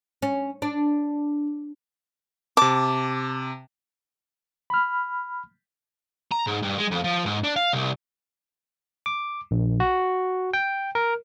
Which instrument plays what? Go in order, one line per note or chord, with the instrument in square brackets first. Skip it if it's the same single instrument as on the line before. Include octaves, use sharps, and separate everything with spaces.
[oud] C#4
D4
[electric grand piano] C3 A5 [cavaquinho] D6
[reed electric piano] B5 F6
[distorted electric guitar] A#5
G#2
G2
G#3
F2
F3
G#2
D4
F5
C2
[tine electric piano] D6
A#1
F#4
G5
A#4